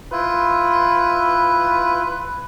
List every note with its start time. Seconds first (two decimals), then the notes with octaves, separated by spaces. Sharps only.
0.12 E4 F4 B4